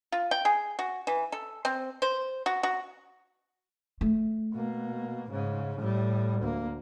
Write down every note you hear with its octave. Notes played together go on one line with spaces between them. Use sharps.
F4
G5
G#4
F#4
E3
A4
C4
C5
F#4
F#4
A3
B2 A#3
G#2 C#3
A2 G3
D2 A#3